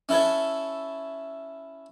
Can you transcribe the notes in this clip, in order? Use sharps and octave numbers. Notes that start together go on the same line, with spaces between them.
C#4 E4 A4 B4 C#5